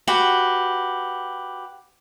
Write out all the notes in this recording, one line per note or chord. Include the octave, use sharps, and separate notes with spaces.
F#4 G4 B4